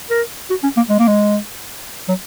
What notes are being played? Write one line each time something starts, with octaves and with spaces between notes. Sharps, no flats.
A#4
F#4
C#4
A#3
G#3
A#3
G#3
F#3